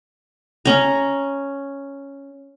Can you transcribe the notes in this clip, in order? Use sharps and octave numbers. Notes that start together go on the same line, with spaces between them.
C#4 A#5